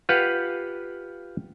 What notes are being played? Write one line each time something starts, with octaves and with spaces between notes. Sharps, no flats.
F4 G4 B4 F5 F#5